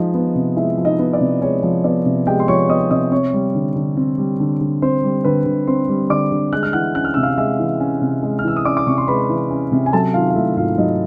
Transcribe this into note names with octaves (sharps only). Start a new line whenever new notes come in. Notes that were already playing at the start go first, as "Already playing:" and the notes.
Already playing: F3 G#3 D#4 D#5
B3
C3
G#3 E4 E5
F3
D#4 D#5
B3
D5
C3
G#3 C#5
F3
B3 D5
C3
G#3 G4 G5
C6
F3 C#5 C#6
B3 D#5 D#6
C3 D#5 D#6
C4 C#5 C#6
G3
D3
D3
C4
G3
D3
D3
C4 C5 C6
G3
D3 B4 B5
D3
C4 C5 C6
G3
D3 D5 D6
D3
G#3 F#6
F6
E3 F#5 F#6
C#4 F#6
F6
C3 E6
F5 F6
G#3 E5 E6
E3
C#4
C3
G#3
F6
E3 E6
D#6
C#4 D5 D6
D6
C3 C#6
C6
G#3 B4 B5
E3
C#4
C3
G#5
F#3 A4 A5
D#3 F4 F5
F5
A3 E4 E5
G#2 F4 F5
F#3 D#4 D#5